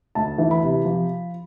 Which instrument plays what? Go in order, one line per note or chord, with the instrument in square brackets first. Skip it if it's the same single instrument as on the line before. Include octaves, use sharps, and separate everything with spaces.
[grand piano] D2 A5
E3
B5
C3
F3